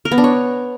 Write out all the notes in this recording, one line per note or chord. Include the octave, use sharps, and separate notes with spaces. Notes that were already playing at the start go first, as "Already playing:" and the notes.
A#4
B3
D4
C#5